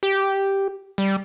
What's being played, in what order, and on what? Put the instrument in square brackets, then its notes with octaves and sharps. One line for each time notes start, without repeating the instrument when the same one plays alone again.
[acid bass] G4
G3